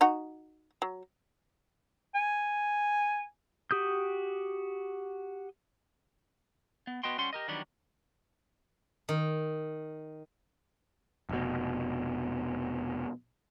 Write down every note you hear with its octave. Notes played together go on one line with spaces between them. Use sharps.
D#4 F#4
F#3
G#5
F#4 G4 D#6 G6
B3
B3 F#4 D#5 G5 C6
G3 C#4 F#5 C6
G4 A#4 D#5
D#3 E3 F#3 G3 B3 D4
D#3
F1 B2